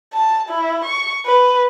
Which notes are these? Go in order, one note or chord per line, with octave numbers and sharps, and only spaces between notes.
A5
E4
C#6
B4